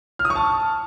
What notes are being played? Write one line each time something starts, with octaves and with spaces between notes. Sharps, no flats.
F6
D#6
C#6
A5